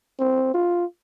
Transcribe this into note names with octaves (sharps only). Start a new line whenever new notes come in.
C4
F4